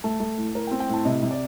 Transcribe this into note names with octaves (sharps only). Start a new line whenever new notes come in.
A3 A5
A3
A2
A2 A#4
G5
C4
G5
A2 A5
C3 D#5
C3
D5